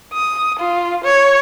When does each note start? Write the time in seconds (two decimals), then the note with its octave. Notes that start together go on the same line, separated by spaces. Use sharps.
0.13 D#6
0.59 F4
1.04 C#5